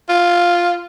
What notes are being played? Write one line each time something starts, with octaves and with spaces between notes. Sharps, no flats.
F4